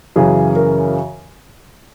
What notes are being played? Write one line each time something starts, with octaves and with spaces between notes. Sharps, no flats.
F#2 C#3 E3 G#4
A#4